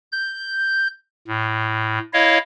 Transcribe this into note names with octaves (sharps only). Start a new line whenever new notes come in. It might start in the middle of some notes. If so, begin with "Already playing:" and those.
G6
A2
E4 C#5 D#5 F5